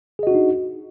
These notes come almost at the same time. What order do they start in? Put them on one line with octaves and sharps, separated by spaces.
G#4 D#5 F#4 D4 D#4